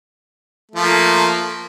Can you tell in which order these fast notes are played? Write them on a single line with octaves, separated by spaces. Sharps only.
A3 F3 A#3